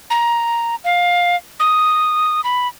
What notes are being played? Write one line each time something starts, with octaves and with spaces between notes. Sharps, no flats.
A#5
F5
D#6
B5